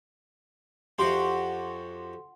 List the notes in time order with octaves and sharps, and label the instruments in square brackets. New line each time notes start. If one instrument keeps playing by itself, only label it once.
[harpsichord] F2 F#4 G4 [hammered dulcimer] F#5 C6